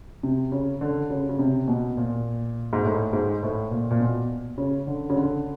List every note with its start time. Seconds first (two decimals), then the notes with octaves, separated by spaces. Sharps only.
0.23 C3
0.52 C#3
0.81 D3
1.10 C#3
1.29 C#3
1.39 C3
1.68 B2
1.97 A#2
2.73 G#2
2.85 A2
3.13 G#2
3.43 A2
3.71 A#2
3.91 A#2
4.00 B2
4.58 C#3
4.87 D3
5.10 C#3
5.16 D3